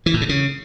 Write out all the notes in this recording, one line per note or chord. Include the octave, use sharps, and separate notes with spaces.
E3
A2
C3
C#3